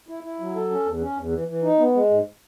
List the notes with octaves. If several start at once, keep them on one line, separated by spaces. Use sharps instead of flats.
E4
E4
F#3
A4
C#4
E2
C#4
E2
E3
E3
D#4
B3
G#3
G#2